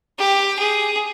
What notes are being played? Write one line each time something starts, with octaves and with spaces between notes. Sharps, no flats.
G4
G#4